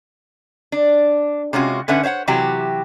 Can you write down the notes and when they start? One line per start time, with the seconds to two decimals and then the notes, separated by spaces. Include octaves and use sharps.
0.72 D4
1.53 C3 G#3 C#4 F4 F#4
1.88 D3 C#4 B4 E5 F#5
2.03 C5 C#5 F5 F#5
2.27 C3 E3 F#3 F#4 G4